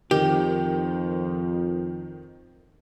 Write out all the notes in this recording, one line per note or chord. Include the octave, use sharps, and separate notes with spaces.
F2 D#3 G4